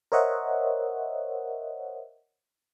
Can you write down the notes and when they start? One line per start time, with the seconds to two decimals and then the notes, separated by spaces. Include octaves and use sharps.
0.12 A#4 C5 C#5 D#5 E5 F#5